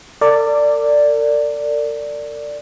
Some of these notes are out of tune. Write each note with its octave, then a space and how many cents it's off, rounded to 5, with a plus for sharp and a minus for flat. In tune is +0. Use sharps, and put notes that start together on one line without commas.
A#4 -45 D5 +0